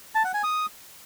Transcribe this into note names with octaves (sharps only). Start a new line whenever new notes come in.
A5
F#5
G#5
D#6